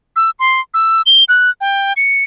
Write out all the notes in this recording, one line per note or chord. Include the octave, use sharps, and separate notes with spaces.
E6
C6
E6
G7
F#6
G5
C#7